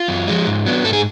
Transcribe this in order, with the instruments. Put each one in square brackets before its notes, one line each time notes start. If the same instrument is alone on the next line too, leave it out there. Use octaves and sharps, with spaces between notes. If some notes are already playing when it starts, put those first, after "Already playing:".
Already playing: [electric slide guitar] F4
F#2
F3 G#3
G#2
F#3 B3 D4
G#2 A4
G#4